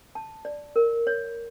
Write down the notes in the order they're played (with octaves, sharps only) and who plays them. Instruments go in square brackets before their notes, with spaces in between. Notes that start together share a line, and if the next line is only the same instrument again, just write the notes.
[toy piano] A5
D5
A#4
C#5